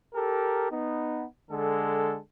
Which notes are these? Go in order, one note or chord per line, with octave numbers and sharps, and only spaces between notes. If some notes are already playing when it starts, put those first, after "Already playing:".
G4 A4 A#4
B3 D#4
D3 G#3 A4